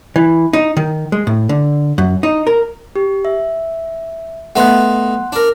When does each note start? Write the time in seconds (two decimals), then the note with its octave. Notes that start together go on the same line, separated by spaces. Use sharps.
0.16 E3
0.53 D#4
0.77 D#3
1.12 G#3
1.27 A2
1.49 D3
1.98 F#2
2.23 D#4
2.47 A#4
2.96 G4
3.25 E5
4.56 A3 B3 D#4 F#5 C6 F#6
5.32 D4 A#4